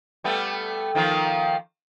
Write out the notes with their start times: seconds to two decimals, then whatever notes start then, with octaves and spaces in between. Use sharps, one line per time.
0.24 G3 A3 B3
0.95 D#3 F3 A#3